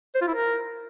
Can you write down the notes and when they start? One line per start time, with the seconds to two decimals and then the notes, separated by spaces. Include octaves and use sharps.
0.15 C5
0.21 F4
0.28 E4
0.34 A#4